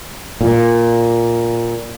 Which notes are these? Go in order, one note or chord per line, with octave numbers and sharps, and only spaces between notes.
A#2